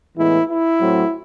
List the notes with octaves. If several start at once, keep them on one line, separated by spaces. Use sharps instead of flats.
A2 E3 G#3 B3 E4
E4
A2 F#3 A3 C4